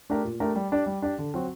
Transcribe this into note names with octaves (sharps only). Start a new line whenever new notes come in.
A3 D4 G4 A#4
A#2
A3 D4 G4 A#4
G3
D4 G4 D5
G3
D4 G4 D5
D3
F#3 C4 F#4